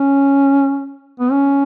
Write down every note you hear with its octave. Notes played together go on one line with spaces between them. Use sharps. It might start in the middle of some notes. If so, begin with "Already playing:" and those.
Already playing: C#4
B3
C#4